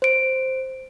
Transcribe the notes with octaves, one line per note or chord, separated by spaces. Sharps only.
C5 D7